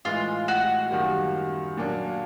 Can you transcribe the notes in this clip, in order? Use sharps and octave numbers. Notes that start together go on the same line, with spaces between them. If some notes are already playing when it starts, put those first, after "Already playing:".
A2 E3 G#3 F4
F#4
F#2 D#3 G3 A#3
A#2 F#3 A#3 D4